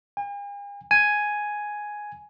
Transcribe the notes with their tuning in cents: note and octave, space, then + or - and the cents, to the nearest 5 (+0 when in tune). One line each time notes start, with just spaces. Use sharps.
G#5 -45
G#5 +5